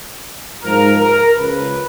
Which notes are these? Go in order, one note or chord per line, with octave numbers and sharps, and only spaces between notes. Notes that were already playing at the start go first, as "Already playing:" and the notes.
G#2 F3 A#4
A#4
C#2 C#3 F3 B4